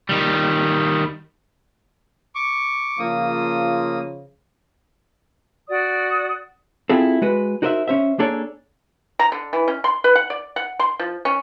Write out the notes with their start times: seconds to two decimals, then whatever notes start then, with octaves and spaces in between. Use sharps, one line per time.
0.09 D#3 G3
2.35 C#6 D6
2.99 C#3 F3 A#3 F4 D#6
5.68 F#4 D5 D#6
6.90 C4 E4 F4 G#4 A4
7.22 G#3 F#4 B4
7.62 D#4 F#4 A#4 C5 D#5 E5
7.88 C#4 C5 E5
8.19 A#3 D4 G#4 A4 C#5 D5
9.19 A#5
9.32 D3
9.53 E3
9.68 C#4
9.84 C6
10.04 B4
10.15 F#5
10.30 D5
10.56 F#5
10.79 C6
10.99 F3
11.25 C#4